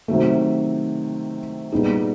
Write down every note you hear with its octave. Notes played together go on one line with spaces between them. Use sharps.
C3 D#3 F#3 A3
A#2 G3 B3 D#4 G#4